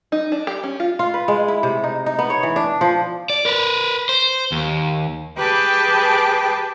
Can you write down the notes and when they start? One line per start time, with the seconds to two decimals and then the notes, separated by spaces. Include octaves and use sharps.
0.12 D#4
0.32 D4
0.47 G4
0.64 C#4
0.80 F4
0.99 F4
1.14 B4
1.28 G#3
1.48 E4
1.63 C3
1.84 D#4
2.06 D#4
2.19 B3
2.30 C#5
2.43 E3
2.56 D4
2.81 F3
3.30 D5
3.45 A#4 B4
4.09 C5
4.52 D#2
5.37 G4 G#4 B4 G5 A5 D6